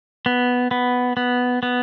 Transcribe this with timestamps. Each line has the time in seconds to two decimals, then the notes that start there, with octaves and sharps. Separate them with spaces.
0.26 B3
0.71 B3
1.17 B3
1.63 B3